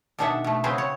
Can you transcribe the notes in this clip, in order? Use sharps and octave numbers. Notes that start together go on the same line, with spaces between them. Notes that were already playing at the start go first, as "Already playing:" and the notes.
B2 D#3 D4 G#4 E5 F#5
B2 A3
C#3 C4 F#4 G#4 B4 C5
C#5